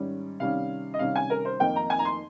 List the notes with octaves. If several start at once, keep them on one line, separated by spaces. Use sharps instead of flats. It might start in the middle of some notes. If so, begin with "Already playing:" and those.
Already playing: G#2 D#3 G3 C#4
C3 D#3 G3 C#4 F5
D#5
C3 D#3 G3 C#4 F5
G#5
A#4
C5
F2 D#3 A#3 D#4 G5
A#5
G#5
A#5
C6